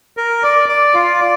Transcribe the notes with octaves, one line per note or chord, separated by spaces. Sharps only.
A#4
D5
D5
F4
D5